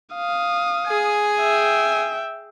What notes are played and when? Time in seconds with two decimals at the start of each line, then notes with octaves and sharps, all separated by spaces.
0.14 F5 D#6
0.87 G#4 G#5
1.40 E5 G5